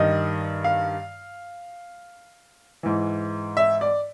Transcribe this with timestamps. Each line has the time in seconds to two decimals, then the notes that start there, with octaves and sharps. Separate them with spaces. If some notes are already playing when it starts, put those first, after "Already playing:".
Already playing: G2 D#3 D#5
0.64 F5
2.83 G#2 E3
3.57 E5
3.81 D5